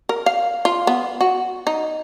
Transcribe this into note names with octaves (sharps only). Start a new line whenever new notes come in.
A#4
F5
F4
B3
F#4
D#4